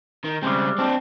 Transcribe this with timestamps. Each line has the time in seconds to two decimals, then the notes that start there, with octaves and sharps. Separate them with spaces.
0.24 D#3
0.43 C#3 G3 G#3 C4
0.78 C4 D4